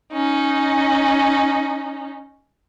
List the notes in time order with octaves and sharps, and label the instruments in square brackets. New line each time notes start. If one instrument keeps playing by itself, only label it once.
[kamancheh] C#4 D#4